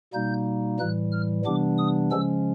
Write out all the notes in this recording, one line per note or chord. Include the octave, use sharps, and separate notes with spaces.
B2 G3 A#3 D#4 G6
A2 E3 G3 F#6
F6
C3 E3 G3 B3 D4 D6
D#6
C#3 F3 G#3 C#4 E6